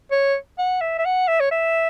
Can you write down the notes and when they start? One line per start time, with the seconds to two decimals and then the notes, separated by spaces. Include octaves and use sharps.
0.11 C#5
0.58 F#5
0.81 E5
0.99 E5
1.05 F#5
1.28 E5
1.40 C#5
1.51 E5